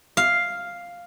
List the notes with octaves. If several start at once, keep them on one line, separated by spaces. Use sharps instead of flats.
F5